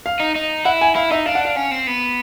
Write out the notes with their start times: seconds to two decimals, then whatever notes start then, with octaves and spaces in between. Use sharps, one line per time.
0.06 F5
0.20 D#4
0.36 D#4
0.65 E4 F#5
0.81 G#5
0.95 E4 F5
1.11 D#4 E5
1.26 D4 F5
1.35 F#5
1.45 F5
1.57 C#4
1.71 C4
1.87 B3